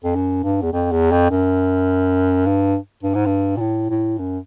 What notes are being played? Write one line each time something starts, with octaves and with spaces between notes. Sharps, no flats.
F2
F#2
G2
E2
F2
E2
F2
F#2
G2
G2
G#2
G2
A#2
A2
A2
F#2